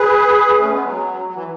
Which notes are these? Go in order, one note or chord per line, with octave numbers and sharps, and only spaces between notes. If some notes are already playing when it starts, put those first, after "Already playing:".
Already playing: G#4 B4
A3 C#4
G#3 B3
F#3
F#3
E3